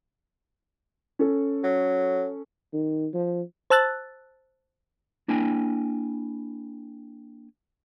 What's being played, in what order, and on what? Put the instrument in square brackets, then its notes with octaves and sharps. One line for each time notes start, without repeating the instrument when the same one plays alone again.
[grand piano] C#4 A4
[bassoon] F#3
[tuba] D#3
F3
[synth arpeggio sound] C5 A5 E6 F#6 A6
[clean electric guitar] A#3 D4 E4 G5 G#5